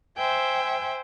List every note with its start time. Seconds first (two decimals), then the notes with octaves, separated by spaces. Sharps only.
0.17 C5 E5 G5 G#5